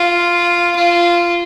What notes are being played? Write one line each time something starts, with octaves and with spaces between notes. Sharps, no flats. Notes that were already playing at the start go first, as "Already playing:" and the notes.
Already playing: F4
F4